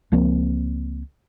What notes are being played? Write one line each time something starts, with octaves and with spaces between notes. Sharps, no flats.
C#2 F3 A#3 C4